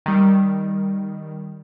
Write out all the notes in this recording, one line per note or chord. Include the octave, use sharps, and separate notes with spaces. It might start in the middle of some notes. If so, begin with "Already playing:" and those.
D#3 G3